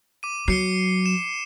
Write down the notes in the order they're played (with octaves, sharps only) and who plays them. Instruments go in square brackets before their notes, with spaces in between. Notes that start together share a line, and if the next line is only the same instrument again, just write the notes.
[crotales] D6 D#7
[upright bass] F#3 [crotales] C7 C#7 G7
[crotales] E7